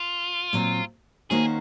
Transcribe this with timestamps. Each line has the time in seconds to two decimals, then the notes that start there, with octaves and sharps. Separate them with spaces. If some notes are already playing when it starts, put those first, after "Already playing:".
Already playing: F4
0.53 A#2 F#3 C4
1.30 D#3 A#3 C#4 F#4 G#4 C5